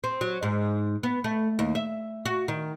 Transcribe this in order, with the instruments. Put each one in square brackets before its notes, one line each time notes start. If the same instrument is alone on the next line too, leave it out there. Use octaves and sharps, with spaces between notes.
[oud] C4
F#3
G#2
B3
A3
D#2
E5
F#4
D#3